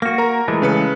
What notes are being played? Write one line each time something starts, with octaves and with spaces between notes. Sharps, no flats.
A#3 F#4 A#6
A#4 A#5
E3 G#3 A3
C#3 B4 C#7